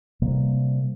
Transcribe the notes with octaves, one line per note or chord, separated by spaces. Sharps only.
C3 G3 A#3